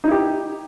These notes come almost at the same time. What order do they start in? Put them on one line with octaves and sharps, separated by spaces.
D#4 E4 G4